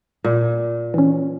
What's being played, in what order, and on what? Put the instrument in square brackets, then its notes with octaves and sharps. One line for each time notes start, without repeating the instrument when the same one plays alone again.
[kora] A#2
[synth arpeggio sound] E3 C#4